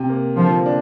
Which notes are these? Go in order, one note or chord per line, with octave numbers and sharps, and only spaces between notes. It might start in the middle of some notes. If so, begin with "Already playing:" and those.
Already playing: C3
A#3
D3 F3
D4